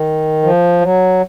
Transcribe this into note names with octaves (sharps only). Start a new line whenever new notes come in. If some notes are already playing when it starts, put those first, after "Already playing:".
Already playing: D#3
F3
F#3